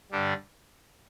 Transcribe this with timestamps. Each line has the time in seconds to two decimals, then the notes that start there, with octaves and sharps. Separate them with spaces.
0.11 G2 D3 G3 D4